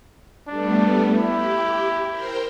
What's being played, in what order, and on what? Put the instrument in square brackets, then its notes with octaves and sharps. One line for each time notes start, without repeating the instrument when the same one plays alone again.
[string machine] G3 A3 B3 [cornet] D4
[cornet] E4 [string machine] G4
[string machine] A#4 C5 G5